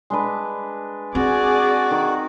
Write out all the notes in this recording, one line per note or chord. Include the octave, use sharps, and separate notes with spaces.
G#3 D4 B4
C4 F#4 G#4 D5
D#3